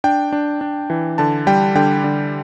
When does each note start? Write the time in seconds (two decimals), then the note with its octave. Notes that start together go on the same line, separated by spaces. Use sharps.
0.04 D4 G5
0.32 D4
0.61 D4
0.90 E3
1.18 D3 A5
1.47 G3 G5
1.75 D3 G5
2.04 D3